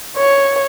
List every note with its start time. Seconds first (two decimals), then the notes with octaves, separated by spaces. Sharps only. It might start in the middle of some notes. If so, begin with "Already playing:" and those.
0.16 C#5